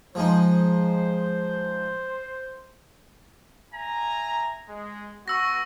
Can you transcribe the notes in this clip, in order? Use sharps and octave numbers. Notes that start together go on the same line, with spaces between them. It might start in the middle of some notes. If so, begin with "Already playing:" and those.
F3 G#3 D#4 C5
E5 G#5 A#5
G#3
B3 F#4 C#6 E6 A#6